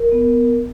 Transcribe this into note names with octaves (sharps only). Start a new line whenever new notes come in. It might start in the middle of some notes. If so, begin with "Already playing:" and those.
Already playing: A#4
B3